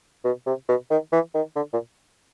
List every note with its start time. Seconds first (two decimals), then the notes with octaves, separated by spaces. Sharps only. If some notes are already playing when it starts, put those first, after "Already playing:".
0.25 B2
0.46 C3
0.69 B2
0.91 D#3
1.13 E3
1.35 D#3
1.56 D3
1.73 A#2